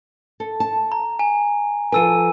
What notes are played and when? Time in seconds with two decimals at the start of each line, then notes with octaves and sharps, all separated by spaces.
0.40 A4
0.60 A5
0.92 A#5
1.19 G#5
1.92 F3 A4 B4 G#5 E6 D#7